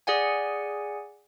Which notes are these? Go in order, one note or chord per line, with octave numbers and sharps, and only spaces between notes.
G#4 D5 F#5 G#5